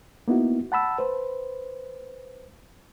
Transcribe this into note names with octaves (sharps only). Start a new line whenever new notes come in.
A#3 B3 D#4 E4 F#4
F#5 A5 B5 E6
B4 C5